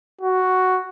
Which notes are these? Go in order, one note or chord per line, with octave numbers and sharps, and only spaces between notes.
F#4